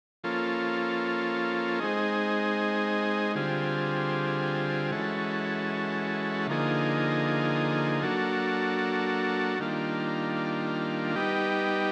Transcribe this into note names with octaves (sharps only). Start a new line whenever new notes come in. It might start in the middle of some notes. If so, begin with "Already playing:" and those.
F3 A#3 C#4 F4 A4
G#3 C4 D#4 G#4
D3 G3 C4 F4 G#4
E3 G#3 C#4 F#4 A4
D3 F3 A#3 D#4 G#4
F#3 A#3 D4 F#4 A4
D#3 G3 A#3 D4 F4
G3 B3 D#4 G4